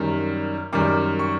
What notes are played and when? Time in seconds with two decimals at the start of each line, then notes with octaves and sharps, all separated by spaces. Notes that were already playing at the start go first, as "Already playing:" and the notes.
Already playing: F#2 D#3 G3
0.73 F#2 D#3 G3 D6
1.19 C#6